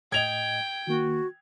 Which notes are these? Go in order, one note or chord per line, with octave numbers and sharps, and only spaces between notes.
A2 D#5 G5 G#6 F7
D#3 A#3 F#4